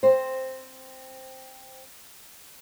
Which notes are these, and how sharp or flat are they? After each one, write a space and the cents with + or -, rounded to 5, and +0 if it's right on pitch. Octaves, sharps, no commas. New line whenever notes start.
C4 +5 C5 +0